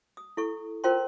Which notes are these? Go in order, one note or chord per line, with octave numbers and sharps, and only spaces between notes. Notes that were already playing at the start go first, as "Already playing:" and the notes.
D#6
E4 A4 C#6
F4 A#4 C5 G5 A#5 C6